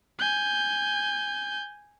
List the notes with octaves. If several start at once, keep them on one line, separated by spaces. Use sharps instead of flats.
G#5 G6